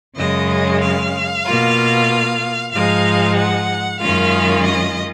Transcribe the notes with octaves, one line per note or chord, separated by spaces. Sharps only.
F#2 C#3 G#3 C#4 D#5
F5
B2 A#3 F4
G#2 F3 G#3 D#4 F5
F#5
F#2 D#3 G#3 C#4 F4 F5
D#5